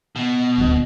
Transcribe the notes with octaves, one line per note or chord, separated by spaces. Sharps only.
B2
D#1 D2